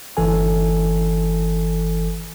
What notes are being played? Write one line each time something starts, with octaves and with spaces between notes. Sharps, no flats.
G1 E3 A4 G#5